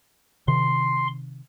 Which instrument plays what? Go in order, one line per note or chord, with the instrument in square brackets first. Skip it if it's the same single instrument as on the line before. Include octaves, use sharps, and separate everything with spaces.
[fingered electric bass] C3 D#3 [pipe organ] C6